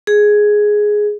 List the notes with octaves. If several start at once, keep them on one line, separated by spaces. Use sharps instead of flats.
G#4